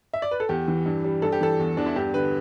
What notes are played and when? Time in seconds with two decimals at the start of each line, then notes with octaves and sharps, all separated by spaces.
0.13 E5
0.22 D5
0.31 B4
0.40 A4
0.49 E2 G4
0.68 E3
0.86 G2
1.04 G3
1.22 G2 A4
1.32 G4
1.41 E3 A4
1.59 E2
1.77 E2 D4
1.86 E4
1.96 G2 G4
2.14 D3 B4